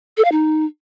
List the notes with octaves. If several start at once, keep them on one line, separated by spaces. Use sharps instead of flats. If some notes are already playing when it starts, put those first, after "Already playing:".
A4
F5
D#4